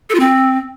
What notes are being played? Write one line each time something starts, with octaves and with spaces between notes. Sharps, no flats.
A4
F4
C4